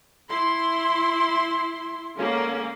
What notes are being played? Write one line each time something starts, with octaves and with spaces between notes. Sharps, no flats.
E4 C6
D3 G#3 A#3 C#4